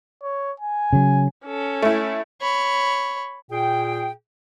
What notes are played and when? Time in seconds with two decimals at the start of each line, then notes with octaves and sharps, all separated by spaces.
0.23 C#5
0.60 G#5
0.93 C#3 F#3
1.45 C#4 A4
1.82 A3 E4
2.41 C#5 B5
3.51 A#2 G#4 G5